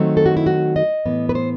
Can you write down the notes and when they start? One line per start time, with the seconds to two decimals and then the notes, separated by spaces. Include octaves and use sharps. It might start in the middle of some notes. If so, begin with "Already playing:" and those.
Already playing: D#3 F#3 A3 C4
0.17 A4
0.26 F#4
0.37 E4
0.46 F#4
0.76 D#5
1.06 A2 E3 B3
1.29 B4
1.35 C5